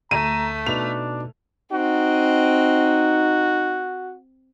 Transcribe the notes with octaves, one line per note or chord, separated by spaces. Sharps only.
D2 A3 A#5 D#7
B2 D4 D#4 B4 F7
C4 D#4 F#4 D#5